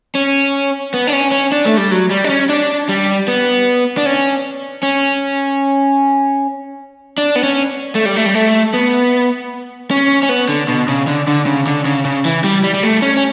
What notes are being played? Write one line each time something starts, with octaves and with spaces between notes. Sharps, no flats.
C#4
B3
D4
C#4
C#4
D4
A3
G3
F#3
G3
D4
C#4
D4
G3
B3
D4
C#4
C#4
D4
B3
C#4
A3
G3
A3
G3
A3
B3
C#4
C#4
B3
D3
B2
C#3
D3
D3
C#3
D3
C#3
C#3
E3
G3
G3
G3
A3
C#4
C#4